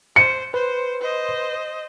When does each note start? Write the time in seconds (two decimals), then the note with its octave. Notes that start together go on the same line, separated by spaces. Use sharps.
0.16 C5 C#7
0.54 B4 C5
1.02 C5 D#5